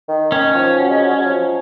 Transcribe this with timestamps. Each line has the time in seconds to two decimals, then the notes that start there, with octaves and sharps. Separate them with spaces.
0.09 D#3
0.32 D#3 C#4
0.55 F3
0.79 F#3
0.90 G#3
1.03 F#3
1.14 F#3
1.25 F3